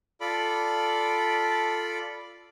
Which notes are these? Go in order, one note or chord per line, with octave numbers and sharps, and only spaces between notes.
F4 A4 D5 B5